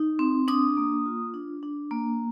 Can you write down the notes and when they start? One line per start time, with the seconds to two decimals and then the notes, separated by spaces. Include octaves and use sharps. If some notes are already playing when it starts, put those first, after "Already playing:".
Already playing: D#4
0.19 C4
0.48 D4 D#6
0.77 A#3
1.06 F4
1.34 D4
1.63 D4
1.91 A#3